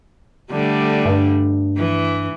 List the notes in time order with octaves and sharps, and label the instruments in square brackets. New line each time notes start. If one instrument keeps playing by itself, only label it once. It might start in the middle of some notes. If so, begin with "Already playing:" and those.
[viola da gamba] D3 G3 A3
[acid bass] G2
[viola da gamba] E3